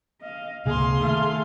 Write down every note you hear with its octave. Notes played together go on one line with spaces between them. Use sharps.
D#5 F5
C#2 C3 A#3 G#4 F5 C6
D#3 A3 F5